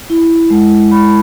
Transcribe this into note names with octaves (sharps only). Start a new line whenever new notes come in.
E4
G#3
G#3 B5